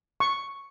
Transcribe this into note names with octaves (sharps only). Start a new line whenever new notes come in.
C#6